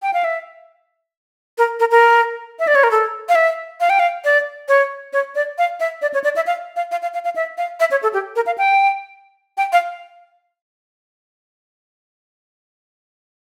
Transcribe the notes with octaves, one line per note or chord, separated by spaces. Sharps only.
G5
F5
E5
A#4
A#4
A#4
E5
D5
C#5
A#4
A4
F5
E5
F5
G5
F5
D5
C#5
C#5
D5
F5
E5
D5
C#5
D5
E5
F5
F5
F5
F5
F5
F5
E5
F5
E5
C#5
A4
G4
A#4
F5
G5
G5
F5